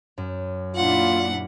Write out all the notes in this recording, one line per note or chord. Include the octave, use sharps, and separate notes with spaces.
F#2
A#2 D4 E4 F4 F#5